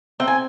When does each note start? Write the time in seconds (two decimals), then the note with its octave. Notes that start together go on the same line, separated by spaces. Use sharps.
0.20 C4 G5
0.28 G#5